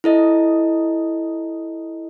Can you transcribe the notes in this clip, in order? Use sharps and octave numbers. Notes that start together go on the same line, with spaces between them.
E4 A4 D#5